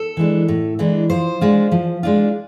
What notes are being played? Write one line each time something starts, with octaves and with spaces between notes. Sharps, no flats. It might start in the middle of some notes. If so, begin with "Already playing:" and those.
Already playing: A4
E3 G#3 D4
A2
E3 G#3 D4
F3 C5
G#3 D4 F4
F3
G#3 D4 F4